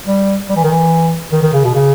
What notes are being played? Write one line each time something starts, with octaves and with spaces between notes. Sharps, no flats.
G3
G3
E3
D#3
E3
D#3
D#3
C#3
B2
C#3